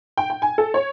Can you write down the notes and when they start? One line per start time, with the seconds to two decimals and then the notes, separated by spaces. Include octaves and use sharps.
0.17 G5
0.30 G5
0.42 G#5
0.58 A4
0.74 C#5